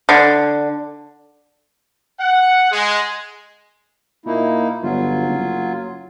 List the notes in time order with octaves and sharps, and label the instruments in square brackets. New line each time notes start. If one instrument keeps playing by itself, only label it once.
[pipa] D3
[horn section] F#5
G#3
[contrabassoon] A#2 [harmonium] A#3 D#4 E4
[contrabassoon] G1 [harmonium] F#3 F4
[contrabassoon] F#1